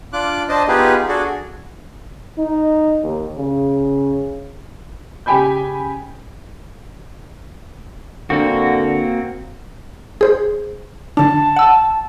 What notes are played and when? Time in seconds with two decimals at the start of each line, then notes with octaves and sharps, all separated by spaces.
0.13 D4 F4 D6 F#6
0.49 D4 C5 D#5 A5
0.68 B3 D#4 F4 G4 G#4 B4
1.08 D4 F#4 G#4 A4
2.38 D#4
3.03 D#2
3.37 C#3
5.26 C#3 G4 G5 G#5 B5 G6
8.30 D3 A#3 C4 F#4
10.21 G#4 C5
11.17 D3 D4 A5
11.56 F#5 E6